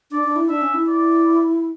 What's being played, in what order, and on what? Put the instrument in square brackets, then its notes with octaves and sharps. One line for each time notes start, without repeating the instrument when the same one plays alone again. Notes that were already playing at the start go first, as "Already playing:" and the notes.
[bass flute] D4 [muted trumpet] D5
[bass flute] D4
E4
[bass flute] D4 [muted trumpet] E5
[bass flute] C#4
E4
[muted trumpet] D5